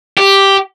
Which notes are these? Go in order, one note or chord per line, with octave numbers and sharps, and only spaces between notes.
G4